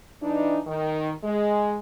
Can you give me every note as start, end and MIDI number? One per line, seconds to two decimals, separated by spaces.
0.22 0.59 52
0.22 0.59 62
0.22 0.59 63
0.67 1.11 51
1.23 1.78 56